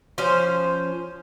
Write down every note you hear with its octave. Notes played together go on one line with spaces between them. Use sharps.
F3 C#4 C5